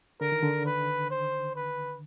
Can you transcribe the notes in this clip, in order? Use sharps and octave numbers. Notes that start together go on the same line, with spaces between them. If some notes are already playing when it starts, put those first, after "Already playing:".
D3 A#4
D#3
D3
B4
C5
B4